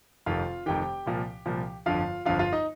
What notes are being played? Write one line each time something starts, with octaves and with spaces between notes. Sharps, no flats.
F1 F2 D#3 F4 F5
F1 F2 D#3 G4 G5
C2 A#2 F3
C2 A#2 F3
G1 F2 D3 F3 F4 F5
G1 F2 D3 F3 F4 F5
F4 F5
D#4 D#5